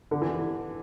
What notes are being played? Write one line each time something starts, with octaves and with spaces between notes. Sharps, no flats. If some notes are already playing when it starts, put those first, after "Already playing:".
D3
E3